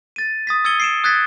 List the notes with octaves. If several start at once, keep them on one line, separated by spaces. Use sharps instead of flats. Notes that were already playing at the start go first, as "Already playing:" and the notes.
A6 D#7
D#6 A6 B6
D#6 E6 G#6 C#7 D#7 G7
C7 D7 E7
D#6 F#6 G#6 A6 B6